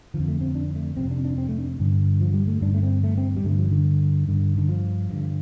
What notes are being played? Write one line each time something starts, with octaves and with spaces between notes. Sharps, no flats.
D3 F3
F2
A3
C4
D4
A3
F2 C3 C4
D4
D4
C4
A3
D4
G2 D3
F3
G3
A3
G2 D3 D4
A3
C4
A3
C4
G3
G2 D3 A3
F3
D3
G2 D3
D3
F3
G2 D3